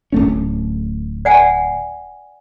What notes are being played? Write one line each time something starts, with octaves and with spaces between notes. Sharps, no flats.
D1 A3 C#4
D5 F#5 G#5